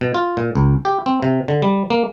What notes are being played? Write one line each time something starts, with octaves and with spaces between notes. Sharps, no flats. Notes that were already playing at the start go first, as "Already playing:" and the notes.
B2
F4
A#2
C#2
G4
C4
C3
D3
G3
A#3